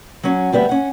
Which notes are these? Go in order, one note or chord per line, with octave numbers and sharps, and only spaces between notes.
F#3 C#4
D2 G3 B3 E5
C#4 F#5